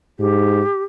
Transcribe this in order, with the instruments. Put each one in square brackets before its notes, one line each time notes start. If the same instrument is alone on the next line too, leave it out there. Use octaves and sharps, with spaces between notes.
[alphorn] G#2 [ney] G4